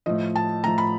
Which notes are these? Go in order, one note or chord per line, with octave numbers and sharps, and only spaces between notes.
A2 F3 D#5
A5
A2 F3 A#5
B5